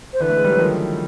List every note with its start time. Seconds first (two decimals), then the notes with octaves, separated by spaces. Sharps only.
0.13 C5
0.20 D3 E3 B4
0.29 A3
0.37 G#3
0.44 G3
0.51 F#3
0.59 D#3 F3